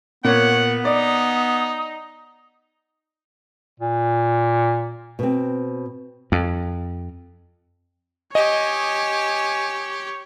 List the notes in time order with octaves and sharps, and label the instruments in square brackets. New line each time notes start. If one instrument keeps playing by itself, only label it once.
[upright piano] A#2 [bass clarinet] B3 [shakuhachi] C#5 [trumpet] F#5
[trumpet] D#4 [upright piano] D5 [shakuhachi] D#6
[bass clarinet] A#2
[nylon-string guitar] B2 C4
[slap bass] F2
[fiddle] G4 [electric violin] C#5 [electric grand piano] D#5 [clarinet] G#5